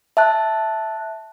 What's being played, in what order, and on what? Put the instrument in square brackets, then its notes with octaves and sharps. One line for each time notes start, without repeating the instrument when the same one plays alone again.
[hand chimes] E5 A5 F#6